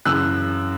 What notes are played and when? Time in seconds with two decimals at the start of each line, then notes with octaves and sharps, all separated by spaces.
0.05 F#2 C#3 E3 E6 F#6